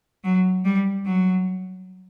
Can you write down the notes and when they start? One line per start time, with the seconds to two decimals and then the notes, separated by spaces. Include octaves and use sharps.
0.24 F#3
0.65 G3
1.05 F#3